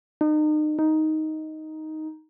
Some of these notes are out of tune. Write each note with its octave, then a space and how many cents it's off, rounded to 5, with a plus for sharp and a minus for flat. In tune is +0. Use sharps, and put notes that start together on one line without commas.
D#4 -35
D#4 +5